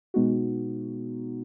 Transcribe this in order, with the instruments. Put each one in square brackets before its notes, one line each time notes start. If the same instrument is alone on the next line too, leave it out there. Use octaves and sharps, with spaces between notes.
[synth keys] B2 G#3 B3 D#4 F#4